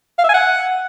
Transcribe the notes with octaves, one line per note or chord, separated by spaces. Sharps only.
F5
E5
G#5
F#5